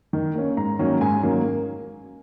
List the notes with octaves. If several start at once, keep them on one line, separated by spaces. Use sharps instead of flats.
D#3
A#3 C#4
G#2 A#5
D#3 F#3 A#3 C#4
G#2 G#5
D#3 F#3 A#3 C#4